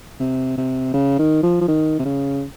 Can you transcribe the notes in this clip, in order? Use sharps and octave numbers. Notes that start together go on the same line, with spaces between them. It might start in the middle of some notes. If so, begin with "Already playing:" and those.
C3
C3
C#3
D#3
F3
F3
D#3
C3
C#3